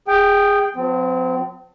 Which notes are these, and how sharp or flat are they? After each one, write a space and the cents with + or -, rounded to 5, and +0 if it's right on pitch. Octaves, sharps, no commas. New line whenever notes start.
G#4 -20 G5 +0
F3 +40 C4 -30